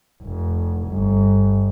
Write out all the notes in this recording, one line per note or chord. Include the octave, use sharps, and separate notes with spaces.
F1
G1